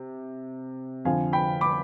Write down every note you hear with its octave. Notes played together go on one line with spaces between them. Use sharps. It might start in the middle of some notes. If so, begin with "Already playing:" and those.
Already playing: C3
F2 D3 F3 F5 G#5
G5 B5
B5 D6